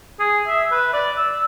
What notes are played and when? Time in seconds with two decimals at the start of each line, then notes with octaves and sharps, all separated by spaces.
0.19 G#4
0.47 E5
0.72 B4
0.93 D5
1.17 E6